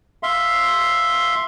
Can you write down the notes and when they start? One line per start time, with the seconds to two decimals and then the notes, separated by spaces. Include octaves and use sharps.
0.23 E5 F5 C6